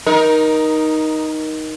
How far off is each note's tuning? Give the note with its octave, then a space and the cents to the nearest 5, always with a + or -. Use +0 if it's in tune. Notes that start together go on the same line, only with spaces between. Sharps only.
D#4 +0 A#4 +20